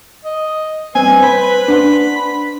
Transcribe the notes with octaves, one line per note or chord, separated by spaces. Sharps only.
D#5
G2 C4 B4 G#5
C5 B5
D4 F#5 C6